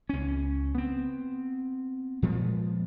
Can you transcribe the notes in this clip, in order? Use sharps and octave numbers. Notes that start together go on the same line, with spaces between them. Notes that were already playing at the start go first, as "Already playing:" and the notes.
C#2 C#4
B3 C4
A#2 F3 G#3 B3